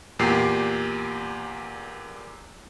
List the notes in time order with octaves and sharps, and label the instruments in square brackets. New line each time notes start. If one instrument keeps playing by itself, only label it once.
[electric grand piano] E2 A#2 G4 C7